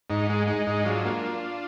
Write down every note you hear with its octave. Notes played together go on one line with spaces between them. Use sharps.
G#2 D#4
G#3
G#3 D#4
G#2 D#4
F#3 D4 F4
A#3